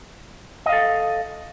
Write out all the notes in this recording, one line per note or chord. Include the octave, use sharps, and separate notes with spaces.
A4 D#5 F5